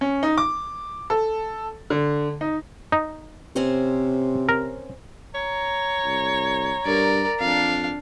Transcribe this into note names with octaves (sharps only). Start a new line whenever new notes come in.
C#4
D#4
D6
A4
D3
D#4
D#4
C3 C4 C#4 C5
A#4
C#5 A#5
C2
G2 A#4 D5
F2 D4 F5